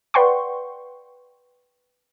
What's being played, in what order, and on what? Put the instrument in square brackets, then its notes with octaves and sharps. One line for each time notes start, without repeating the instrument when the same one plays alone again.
[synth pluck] B4 D5 F#5 G5 C6 C#6